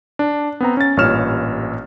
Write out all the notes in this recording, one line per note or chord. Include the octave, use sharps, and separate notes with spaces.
D4
B3 C4 A#5
C#4 A6
A1 G2 A#2 C#5 F6 E7